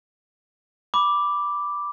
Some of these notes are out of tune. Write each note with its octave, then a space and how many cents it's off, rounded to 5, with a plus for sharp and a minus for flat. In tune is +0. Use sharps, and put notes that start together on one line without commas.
B5 +0 D6 +0